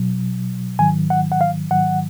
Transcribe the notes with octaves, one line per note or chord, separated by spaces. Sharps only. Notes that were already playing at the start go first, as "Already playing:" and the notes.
Already playing: B2 F#3
G#2 D#3 F#3 G#5
F#5
F#5
F5
G#2 D#3 F#3 F#5